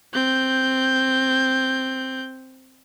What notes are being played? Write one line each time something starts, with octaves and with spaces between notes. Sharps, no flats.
C4 G6